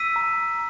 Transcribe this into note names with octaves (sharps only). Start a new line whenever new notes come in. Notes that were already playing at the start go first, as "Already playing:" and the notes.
Already playing: E6 B6 D#7
A#5
A#5